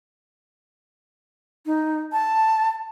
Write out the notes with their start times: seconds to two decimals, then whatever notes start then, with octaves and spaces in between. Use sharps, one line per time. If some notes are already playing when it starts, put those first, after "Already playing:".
1.66 D#4
2.12 A5